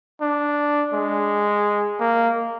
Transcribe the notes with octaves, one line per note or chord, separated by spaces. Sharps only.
D4
G#3
A#3